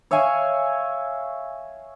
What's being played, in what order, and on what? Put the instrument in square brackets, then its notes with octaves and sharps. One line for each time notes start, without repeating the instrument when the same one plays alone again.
[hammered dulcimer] C#5 E5 F5 G#5